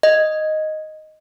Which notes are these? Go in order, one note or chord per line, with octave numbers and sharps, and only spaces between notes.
D#5